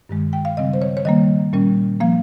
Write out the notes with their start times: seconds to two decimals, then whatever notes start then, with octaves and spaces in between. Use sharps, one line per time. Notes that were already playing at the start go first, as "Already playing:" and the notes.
0.09 G2 D#3 G#3
0.33 G5
0.45 F5
0.57 C#3 G3 C4 D#5
0.74 C5
0.82 C#5
0.97 C#5
1.05 D#3 G3 A#3 D#5
1.53 A#2 G3 C#4
2.00 F3 A#3 F5